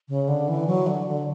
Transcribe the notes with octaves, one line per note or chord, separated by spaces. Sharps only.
C#3
D3
E3
F#3
D3
D3